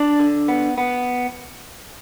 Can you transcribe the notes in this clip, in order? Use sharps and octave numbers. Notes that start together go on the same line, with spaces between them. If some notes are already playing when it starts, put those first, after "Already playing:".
Already playing: D4 D5
D3
B3
B3